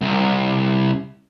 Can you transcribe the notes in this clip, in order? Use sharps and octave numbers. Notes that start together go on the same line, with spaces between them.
C2